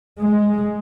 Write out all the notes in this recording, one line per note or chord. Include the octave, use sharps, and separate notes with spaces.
G#3